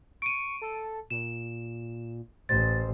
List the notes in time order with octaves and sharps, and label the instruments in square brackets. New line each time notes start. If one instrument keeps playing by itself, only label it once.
[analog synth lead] C#6 [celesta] D7 D#7
[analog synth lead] A4
[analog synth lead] A#2 [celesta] E7
[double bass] A1 [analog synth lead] C5 [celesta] A6